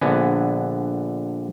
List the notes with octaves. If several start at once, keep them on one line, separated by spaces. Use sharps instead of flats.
A#1 D3 B3 F#5 G#5